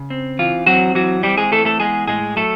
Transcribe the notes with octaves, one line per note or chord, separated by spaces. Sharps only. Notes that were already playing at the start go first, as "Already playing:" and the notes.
Already playing: C#3
C4
E3 F4
F#3 C4 F#4
E3 F#3 F#4
G3 C4 G4
G#3 G#4
E3 A3 A4
A3 A4
G#3 B3 G#4
A2 G#3 G#4
F#3 A3 A4